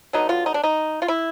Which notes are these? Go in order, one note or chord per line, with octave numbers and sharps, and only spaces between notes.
D3 F#3 B3 D#4
F4
D#4
D4
D#4
F4
E4